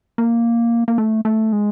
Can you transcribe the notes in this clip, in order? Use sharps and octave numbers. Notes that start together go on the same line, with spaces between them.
A#3
A#3
A3
A3
G#3